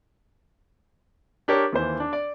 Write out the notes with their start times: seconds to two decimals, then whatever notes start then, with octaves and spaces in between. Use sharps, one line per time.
1.48 D4 G4 A#4 C#5
1.73 D#2 E3 C5
2.00 D4
2.13 D5